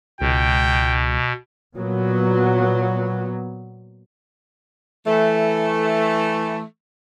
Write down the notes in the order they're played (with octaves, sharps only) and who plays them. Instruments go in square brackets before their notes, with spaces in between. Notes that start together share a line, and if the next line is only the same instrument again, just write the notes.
[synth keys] C#2 [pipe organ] B2 [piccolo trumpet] G5
[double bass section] A#2 F#3 B3
[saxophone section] E3 A3